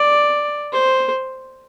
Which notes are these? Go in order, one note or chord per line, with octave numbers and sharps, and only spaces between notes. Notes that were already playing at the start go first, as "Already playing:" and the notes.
Already playing: D5
C5